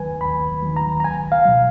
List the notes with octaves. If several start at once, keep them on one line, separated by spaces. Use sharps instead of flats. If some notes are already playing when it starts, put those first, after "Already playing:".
Already playing: D#2 D#3 F#3 B4 G#5
D#2 B5
D#3 F#3
A#5
A#5
C#2 G#5
F5
B2 F#3